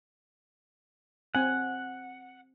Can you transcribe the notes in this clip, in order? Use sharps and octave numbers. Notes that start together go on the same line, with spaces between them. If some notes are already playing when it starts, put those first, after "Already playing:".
C4 F#5 G#5